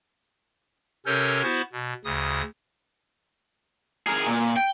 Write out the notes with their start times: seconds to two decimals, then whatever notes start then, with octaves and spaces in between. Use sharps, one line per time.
1.06 C3 C#4 A4 A#4 C#5 G6
1.42 B3 E4 F#4 C5
1.72 B2
2.04 D2 C#3 D#6
4.07 G#4 A#4
4.27 A#2
4.57 G5